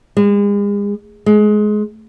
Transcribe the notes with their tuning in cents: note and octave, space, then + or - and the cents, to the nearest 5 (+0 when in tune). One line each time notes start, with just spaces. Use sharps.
G#3 -40
G#3 +20